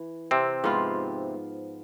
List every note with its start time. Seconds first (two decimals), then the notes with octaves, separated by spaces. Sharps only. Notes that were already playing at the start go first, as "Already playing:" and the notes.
Already playing: E3
0.31 C3 C4
0.64 G#2 F3 B3 F4